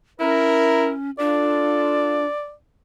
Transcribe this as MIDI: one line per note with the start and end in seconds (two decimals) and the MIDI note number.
0.20 1.11 61
0.20 0.92 64
0.20 0.89 70
1.19 2.25 62
1.19 2.24 65
1.19 2.24 69
1.19 2.52 74